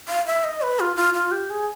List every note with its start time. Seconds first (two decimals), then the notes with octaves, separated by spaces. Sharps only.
0.09 F5
0.26 E5
0.44 D#5
0.62 B4
0.80 F4
0.96 F4
1.14 F4
1.32 G4
1.50 G#4